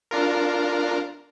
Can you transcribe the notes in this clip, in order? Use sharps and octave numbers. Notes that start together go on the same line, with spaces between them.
D4 F4 A#4